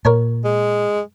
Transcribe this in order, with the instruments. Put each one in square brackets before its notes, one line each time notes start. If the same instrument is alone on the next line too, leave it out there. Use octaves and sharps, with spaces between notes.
[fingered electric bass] A#2 [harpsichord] A#4 C#5 G#5
[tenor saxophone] G#3